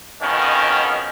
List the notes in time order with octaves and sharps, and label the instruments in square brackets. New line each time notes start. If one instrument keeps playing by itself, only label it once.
[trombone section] F2 B2 D#3 C#4